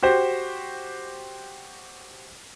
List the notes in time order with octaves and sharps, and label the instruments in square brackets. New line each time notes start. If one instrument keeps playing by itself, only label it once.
[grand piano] F#4 G4 C5